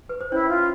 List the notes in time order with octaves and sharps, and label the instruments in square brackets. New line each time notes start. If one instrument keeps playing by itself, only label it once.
[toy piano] B4
C5
[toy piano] C#4 C#5 [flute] E4
[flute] F4